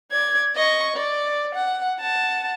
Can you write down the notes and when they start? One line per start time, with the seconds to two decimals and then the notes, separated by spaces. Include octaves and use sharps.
0.11 D5 G#6
0.55 D#5 C#6
0.96 D5
1.55 F#5
1.98 F#5 A5